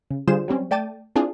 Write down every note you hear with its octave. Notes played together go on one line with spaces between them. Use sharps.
C#3
D3 G3 F4 G#4 C5 E7
F#3 G3 C4 C#4
A3 D5 G5 A5 A6 D#7
C4 D4 E4 F4 G#4